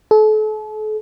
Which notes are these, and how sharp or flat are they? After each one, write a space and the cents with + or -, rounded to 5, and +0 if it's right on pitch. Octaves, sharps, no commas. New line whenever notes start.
A4 -40